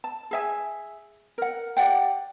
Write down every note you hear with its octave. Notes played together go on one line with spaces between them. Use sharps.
A5
G#4 E5 G#5
A#4 F#5
G4 D5 F#5 G5